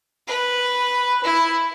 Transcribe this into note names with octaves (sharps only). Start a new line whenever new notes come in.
B4
E4